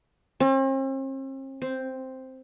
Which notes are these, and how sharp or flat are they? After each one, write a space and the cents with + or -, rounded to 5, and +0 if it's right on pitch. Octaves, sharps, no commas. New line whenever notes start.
C4 +45
C4 +0